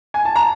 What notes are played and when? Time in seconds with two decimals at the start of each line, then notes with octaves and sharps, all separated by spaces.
0.14 G#5
0.25 A5
0.36 A#5